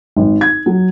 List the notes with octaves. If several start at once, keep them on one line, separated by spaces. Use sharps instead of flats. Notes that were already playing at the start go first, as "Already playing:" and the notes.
G#1
G#6
F#3